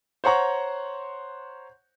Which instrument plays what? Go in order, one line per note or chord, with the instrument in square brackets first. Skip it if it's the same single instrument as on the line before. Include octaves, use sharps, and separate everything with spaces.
[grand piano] C5 C#5 F#5 A#5 C#6